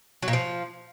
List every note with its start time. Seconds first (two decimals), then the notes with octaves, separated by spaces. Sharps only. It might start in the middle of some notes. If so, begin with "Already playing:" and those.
0.22 F#3
0.28 A#2
0.33 F3